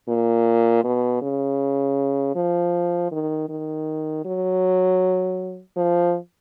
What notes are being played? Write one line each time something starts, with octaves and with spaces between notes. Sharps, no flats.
A#2
B2
C#3
F3
D#3
D#3
F#3
F3